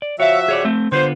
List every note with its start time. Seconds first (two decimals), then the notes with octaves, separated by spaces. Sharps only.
0.02 D5
0.20 F3 F#4 C#5 E5 F5
0.48 G#4 C#5 D5
0.65 A3 C4
0.92 D3 B3 F4 C5